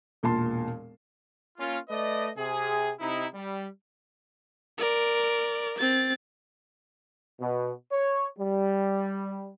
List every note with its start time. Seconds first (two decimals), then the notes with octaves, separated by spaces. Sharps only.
0.23 E1 A#2 F4 A5 C6
1.58 A#3 C#4 F4
1.89 A3 B4 D5 D#5
2.37 C3 G#4
3.00 C3 D#4 E4
3.34 G3
4.78 A#4 D5
5.78 C4 A6
7.41 B2
7.92 C#5
8.38 G3